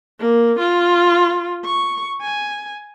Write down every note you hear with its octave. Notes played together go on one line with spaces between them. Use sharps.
A#3
F4
C#6
G#5